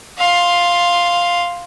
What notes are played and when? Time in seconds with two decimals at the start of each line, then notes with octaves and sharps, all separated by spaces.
0.17 F5 C6